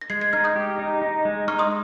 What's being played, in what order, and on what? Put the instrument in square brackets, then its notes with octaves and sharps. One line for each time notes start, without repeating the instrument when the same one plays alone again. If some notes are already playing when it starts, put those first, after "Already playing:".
[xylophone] A#6
[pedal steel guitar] G#3 [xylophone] G#6 C7
[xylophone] G#6 C7
[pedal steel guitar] D#4 [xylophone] F6 G#6
[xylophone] D#6 G6
[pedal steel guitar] G4
D#4
D#4
G#3
[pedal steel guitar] D#4 [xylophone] C#6 F6
[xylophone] C6 D#6